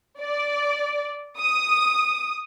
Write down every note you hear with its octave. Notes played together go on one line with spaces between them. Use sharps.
D5
D#6